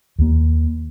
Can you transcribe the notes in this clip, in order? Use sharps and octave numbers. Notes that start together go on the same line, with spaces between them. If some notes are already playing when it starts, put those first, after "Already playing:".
D#2 A#3